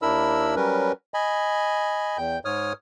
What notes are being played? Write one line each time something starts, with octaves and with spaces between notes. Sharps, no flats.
D#2 D4 E4 A#4 B5 E6
F#3 G3 C#4 A#4 B4
D#5 G#5 B5
E2 G5 G6
G#2 C#5 D#6 F6